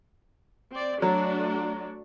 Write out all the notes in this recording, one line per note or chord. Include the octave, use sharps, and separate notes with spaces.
C4 D5
F#3 A3 D4 F#4